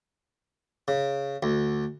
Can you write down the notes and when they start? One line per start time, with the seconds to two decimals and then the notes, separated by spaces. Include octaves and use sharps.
0.88 C#3
1.43 D2